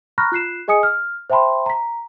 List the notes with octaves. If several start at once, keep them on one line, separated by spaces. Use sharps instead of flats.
A#5 B5 C#6 F6 F#6 A#6
F4 F#6 C7 E7
G#4 D#5 G#5 D#6 C#7
F6
C5 E5 G5 A5 B5 C6
A#5 B6